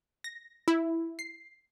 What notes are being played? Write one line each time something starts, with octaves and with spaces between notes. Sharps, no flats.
A#6
E4
C7